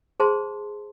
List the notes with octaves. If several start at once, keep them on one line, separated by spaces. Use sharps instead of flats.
G#4 C5 A5 C6